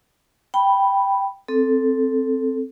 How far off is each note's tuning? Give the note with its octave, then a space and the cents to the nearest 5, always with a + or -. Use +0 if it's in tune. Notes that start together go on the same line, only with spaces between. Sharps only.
G5 +0 B5 +0
C4 +0 A4 -5